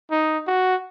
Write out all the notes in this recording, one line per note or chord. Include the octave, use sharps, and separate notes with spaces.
D#4
F#4